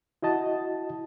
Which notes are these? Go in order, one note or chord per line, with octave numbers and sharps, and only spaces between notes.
E4 F#4 D#5 A5